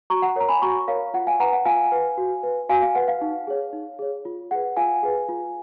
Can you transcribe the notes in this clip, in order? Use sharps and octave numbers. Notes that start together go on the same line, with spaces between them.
F#4 A#5 C#6
F#5 A#5
A#4 C#5 A#5
G#5 B5
F#4 A#5 C#6
A#4 C#5 F5
F4 F#5
F5 G#5
B4 F#5 A#5
F#5
F4 F5 G#5
B4
F#4
B4
F#4 F5 G#5
F5
B4 F#5
F5
D#4
G#4 C#5
D#4
G#4 C#5
F4
G#4 B4 F#5
F4 F5 G#5
G#4 B4
F4